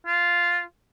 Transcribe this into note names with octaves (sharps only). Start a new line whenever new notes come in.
F4